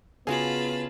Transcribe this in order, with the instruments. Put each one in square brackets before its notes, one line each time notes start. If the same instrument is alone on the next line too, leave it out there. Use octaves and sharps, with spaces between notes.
[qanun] C#3 F#4 [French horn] B3 [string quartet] F4 A5 B5 [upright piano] G#4